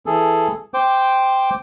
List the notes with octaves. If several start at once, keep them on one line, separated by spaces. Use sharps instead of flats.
E3 G#4 A4
C5 G5 D6